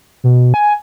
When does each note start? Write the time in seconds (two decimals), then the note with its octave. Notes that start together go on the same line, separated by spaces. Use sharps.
0.24 B2
0.54 G#5